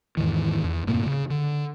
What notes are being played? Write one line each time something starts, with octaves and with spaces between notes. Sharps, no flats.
E2 G#2 D#3 E3
E2
F#2 A2 C3 A#3
C#3
D3